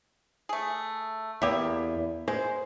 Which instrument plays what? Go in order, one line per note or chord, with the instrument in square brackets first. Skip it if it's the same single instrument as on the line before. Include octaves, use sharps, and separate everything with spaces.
[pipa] A3 G#4
[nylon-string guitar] E2 [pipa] A#3 G4 E5
[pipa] G#3 [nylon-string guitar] C5